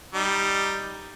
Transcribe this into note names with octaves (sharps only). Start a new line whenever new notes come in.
G3 D#4